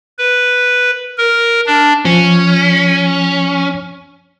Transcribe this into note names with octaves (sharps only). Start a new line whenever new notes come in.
B4
A#4
D4
F3 C#4